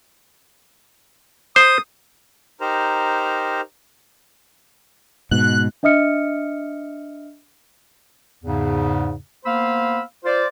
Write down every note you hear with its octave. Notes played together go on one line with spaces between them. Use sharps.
C5 D#6
D#4 G4 A#4 C5 A#5
G#2 B2 F#6
D4 D#5 E5 D#6 F6 C#7
E2 G#2 C#3
A#3 B3 C5 F5 B5 E6
F4 C5 D5